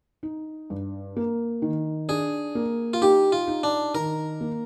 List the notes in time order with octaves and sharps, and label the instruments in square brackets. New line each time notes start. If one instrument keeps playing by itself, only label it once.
[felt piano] D#4
G2
A#3
D#3
[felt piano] D4 [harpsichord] G#4
[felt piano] A#3
[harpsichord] F4
[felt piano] D#4 [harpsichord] G4
[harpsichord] F4
[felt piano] D#4
[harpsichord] D4
[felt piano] D#3 [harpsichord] A#4
[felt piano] A#3